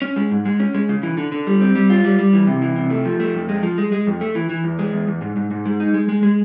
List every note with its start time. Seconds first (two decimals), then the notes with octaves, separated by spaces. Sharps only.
0.02 C#4
0.16 G#3
0.31 G#2
0.45 G#3
0.60 C#4
0.74 G#3
0.89 C#3
1.03 E3
1.17 D3
1.32 D3
1.47 G3
1.61 C4
1.75 G3
1.90 F4
2.04 G3
2.19 G3
2.33 E3
2.47 C3
2.62 E3
2.76 C3
2.90 A3
3.05 F3
3.20 A3
3.34 F2
3.49 G#3
3.63 F3
3.78 G#3
3.92 G#3
4.07 F2
4.21 A3
4.35 E3
4.49 E3
4.64 E2
4.79 G#3
4.93 E2
5.08 E2
5.22 G#2
5.36 G#2
5.51 G#2
5.65 G#3
5.80 D#4
5.94 G#3
6.09 G#3
6.23 G#3